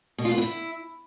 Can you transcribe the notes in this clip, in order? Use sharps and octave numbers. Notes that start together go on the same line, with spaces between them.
B2
F4
B3
E4